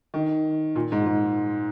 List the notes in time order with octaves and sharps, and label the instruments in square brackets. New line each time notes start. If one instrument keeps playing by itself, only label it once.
[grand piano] D#3
A#2
G#2
G#2